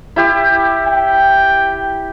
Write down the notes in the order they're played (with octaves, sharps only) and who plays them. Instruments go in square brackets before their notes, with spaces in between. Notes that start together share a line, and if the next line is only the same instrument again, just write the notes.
[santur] E4 G4
[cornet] G5